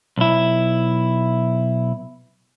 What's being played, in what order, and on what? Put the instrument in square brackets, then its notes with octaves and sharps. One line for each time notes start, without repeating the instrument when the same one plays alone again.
[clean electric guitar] B1 E4